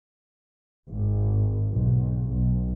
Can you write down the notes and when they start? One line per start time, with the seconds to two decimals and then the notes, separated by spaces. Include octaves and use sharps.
0.89 G#1
1.74 B1
2.25 B1